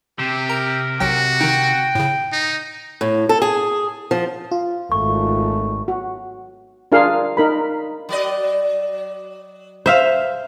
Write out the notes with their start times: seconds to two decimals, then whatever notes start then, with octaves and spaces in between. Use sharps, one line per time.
0.19 C3 G4
0.50 A#4 A#5
1.00 B1 F#3 F#4 G5
1.41 D#3 D#4 G5
1.95 A2 C#3
2.32 D#4
3.01 A2
3.29 A4
3.42 G#4
4.11 F3
4.52 F4
4.92 G#1 A3 C#6
5.88 F#4
6.92 D4 F4 G#4 A#4 F5
7.37 D#4 A#4 B5
8.09 F#3 D5 D#5
9.86 C5 E5 F5